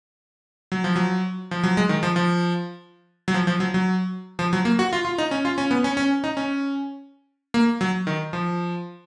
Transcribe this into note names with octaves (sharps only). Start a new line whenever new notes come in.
F#3
F3
F#3
F3
F#3
G#3
D#3
F3
F3
F#3
F3
F3
F#3
F#3
F3
F#3
A#3
F#4
F4
F4
D#4
C#4
F4
C#4
B3
C#4
C#4
D#4
C#4
A#3
F#3
D#3
F3